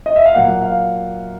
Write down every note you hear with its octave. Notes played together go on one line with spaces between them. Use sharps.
D#5
E5
F5
A#2 F#3 A#3 F#5
F5